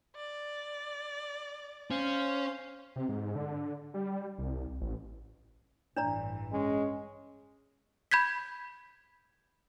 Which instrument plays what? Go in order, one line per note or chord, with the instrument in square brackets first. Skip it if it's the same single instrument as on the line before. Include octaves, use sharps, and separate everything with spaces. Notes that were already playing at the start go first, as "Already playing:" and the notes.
[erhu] D5
[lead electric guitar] C#4 [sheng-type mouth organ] C5 F5
[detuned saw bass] C3
G#2
D3
G3
C2
A1
[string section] A1 G2 E3 [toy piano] D4 D5 A#5
[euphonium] G#3 [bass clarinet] C#4
[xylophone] B5 G6 G#6 B6